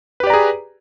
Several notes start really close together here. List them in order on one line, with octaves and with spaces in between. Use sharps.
B4 G4 D5 A#5 G#4